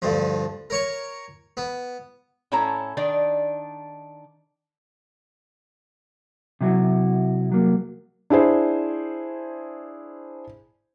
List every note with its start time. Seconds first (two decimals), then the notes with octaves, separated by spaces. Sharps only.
0.02 D2 G2 F3
0.70 A#4 C#5 C#6
1.57 B3
2.52 A2 C#4 E4 A4 C#5 A#5
2.97 D#3 D4 D#4 D5
6.61 C3 F#3 E4 F#4
7.49 C2 F#3 A#3
8.30 D4 E4 G#4 C5